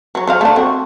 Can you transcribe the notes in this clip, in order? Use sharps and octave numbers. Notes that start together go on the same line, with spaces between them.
F#3 C#5
F#3 C5 F5
A3 D4
C4 F#4